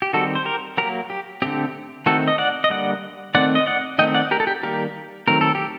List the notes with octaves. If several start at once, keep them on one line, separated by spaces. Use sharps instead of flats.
G4
D#3 G3 C4 F#4 A4
C5
G4 A#4
F#3 A#3 G4 A#4
G4
D3 A3 C4 G4
D#3 A3 C4 F#4 A4
D#5
D5 F#5
D#5
D3 G3 A#3 D5 F#5
D#3 A3 C4 D5 F#5
D#5
D5 F#5
D#3 A3 C4 D#5 G5
D5 F#5
G4 A#4
A4
G4
D#3 G3 A#3 G4 A#4
D#3 F#3 A3 C4 A#4
A4
G4